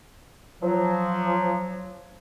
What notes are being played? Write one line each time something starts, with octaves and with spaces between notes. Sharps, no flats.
F3 F#3